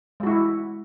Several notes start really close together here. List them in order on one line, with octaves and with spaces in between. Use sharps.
G#3 F#4 E4